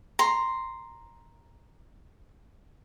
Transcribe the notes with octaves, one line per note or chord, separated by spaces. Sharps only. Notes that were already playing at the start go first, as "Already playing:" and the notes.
A#5 C6